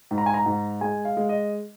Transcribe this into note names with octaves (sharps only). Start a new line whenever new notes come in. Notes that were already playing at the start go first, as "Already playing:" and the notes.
G#2
A#5
G#5
A#5
G#2
G#3 G#5
F5
G#3
D#5